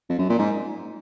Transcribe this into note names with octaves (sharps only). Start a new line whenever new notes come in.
F2
F#2
A#2
G#2